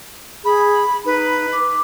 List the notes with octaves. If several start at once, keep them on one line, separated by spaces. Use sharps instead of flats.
G#4 B5
D#4 B4
D6